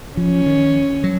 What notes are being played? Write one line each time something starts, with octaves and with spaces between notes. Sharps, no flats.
F3 C#4
D#3
F#3